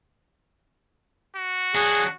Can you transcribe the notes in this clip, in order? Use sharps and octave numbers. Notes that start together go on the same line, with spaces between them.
F#4
F#3 D4 G#4